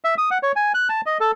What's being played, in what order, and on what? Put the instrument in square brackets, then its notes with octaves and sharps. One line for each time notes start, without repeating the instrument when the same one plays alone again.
[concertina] E5
D#6
F#5
C#5
G#5
F#6
A5
D#5
A4